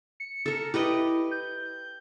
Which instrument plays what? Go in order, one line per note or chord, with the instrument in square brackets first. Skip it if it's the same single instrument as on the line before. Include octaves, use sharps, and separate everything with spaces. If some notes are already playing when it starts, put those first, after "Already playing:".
[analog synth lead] C#7
[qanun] A4 A#4
[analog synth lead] E4 [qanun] G4 B4 D#5
[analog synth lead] G6